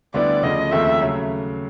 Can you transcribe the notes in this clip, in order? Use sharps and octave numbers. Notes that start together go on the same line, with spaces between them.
D2 D3 G3 B3 E4 D5
D2 C#3 F3 D#5
D#2 C#3 F3 A3 C4 E5
C#3 F#3 A3